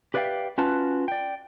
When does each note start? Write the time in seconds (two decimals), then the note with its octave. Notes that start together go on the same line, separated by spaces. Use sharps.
0.14 G4 B4 D5 E5 F5 G5
0.58 C#4 F4 F#4 B4 A5
1.08 D5 G5